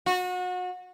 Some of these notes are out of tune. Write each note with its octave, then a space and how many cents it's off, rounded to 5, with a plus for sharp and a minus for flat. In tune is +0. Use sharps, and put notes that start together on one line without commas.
F#4 -30